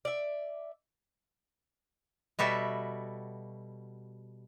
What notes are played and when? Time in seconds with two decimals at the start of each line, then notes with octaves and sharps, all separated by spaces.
0.05 D5 E5
2.39 B2 G3 F#4 A4 E5